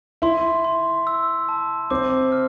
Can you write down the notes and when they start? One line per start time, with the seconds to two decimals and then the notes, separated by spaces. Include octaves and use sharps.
0.22 E4 C6
0.64 C6
1.07 E6
1.49 A5
1.91 C4 D6
2.32 F6